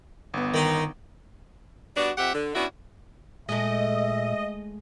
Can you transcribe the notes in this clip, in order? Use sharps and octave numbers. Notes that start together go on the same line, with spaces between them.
G1 B3
D#3 D#4
G3 B3 D4 F#4
F2 C4 G4 E5 F#5
D3
B3 C#4 D4 E4 F#4
A#2 G#3 A3 D#5 E5